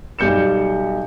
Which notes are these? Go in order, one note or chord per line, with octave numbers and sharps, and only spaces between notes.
B1 G3 G6 C#7 E7